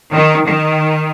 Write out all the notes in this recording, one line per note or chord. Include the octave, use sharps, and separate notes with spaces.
D#3
D#3